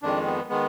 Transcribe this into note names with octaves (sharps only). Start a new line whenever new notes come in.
F2 D#3 G#3 D4
B3
D#3 G#3 B3